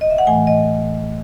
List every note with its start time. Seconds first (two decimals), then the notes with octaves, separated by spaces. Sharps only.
0.01 D#5
0.10 E5
0.18 F#5
0.27 A2 E3 A3 G#5
0.47 D#5